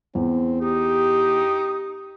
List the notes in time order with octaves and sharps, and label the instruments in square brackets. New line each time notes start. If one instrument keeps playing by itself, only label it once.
[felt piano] E2 [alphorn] C4
[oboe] D#4 [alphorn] G4